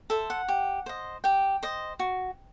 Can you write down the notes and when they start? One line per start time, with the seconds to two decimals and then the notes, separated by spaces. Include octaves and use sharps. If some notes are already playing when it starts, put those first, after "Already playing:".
0.10 A4 C5 E5
0.30 F#5
0.48 G4
0.86 C5 D#5
1.24 G4 G5
1.63 C5 D#5
1.99 F#4